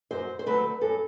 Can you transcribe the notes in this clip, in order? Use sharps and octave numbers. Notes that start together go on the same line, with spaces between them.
F#2 C5
C5
D3 F#3 A3 C4 B4
F#2 A4